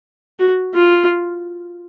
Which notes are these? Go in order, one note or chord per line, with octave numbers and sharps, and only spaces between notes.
F#4
F4